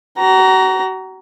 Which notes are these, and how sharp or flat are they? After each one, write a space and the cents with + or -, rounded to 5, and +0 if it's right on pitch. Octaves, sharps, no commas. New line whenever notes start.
F#4 +35 A#5 +0